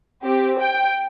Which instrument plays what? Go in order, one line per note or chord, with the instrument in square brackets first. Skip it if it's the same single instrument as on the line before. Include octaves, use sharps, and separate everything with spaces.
[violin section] C4 G4
G5